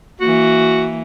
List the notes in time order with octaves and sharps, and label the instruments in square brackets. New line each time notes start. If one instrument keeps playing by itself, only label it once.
[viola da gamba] E3 A#3 [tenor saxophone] F#4